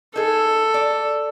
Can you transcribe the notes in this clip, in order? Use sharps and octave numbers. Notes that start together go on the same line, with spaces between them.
D#4 G#4 A4
D5